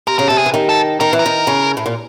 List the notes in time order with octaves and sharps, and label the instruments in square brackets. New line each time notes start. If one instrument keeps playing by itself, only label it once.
[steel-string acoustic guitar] C3 [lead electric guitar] A#4
[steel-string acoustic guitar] C#3 [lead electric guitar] A#4
[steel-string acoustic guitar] C3 [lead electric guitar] A4
[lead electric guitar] G#4
[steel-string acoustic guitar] E3
D#3
[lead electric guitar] A4
[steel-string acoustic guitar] D#3 [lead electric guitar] A#4
[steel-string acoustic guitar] E3
[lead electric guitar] A#4
[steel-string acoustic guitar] D#3
C#3
A2
A#2